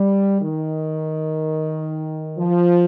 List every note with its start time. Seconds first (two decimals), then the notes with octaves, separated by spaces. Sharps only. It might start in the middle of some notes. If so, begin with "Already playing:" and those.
Already playing: G3
0.42 D#3
2.37 F3